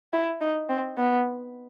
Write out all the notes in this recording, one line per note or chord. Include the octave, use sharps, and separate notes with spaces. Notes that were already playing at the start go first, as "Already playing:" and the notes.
E4
D#4
C4
B3